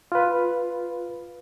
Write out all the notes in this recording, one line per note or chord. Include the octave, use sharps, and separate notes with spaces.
F4 B4